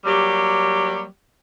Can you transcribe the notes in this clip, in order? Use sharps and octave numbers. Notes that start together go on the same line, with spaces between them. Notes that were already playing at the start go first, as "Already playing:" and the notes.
F#3 G3 A#3 G4